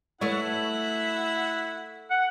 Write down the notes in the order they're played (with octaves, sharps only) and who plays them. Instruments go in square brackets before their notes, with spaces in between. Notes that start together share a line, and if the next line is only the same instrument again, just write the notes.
[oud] A3 B4 C#5 [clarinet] E4 [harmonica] F#4 E5 F#5
[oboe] F#5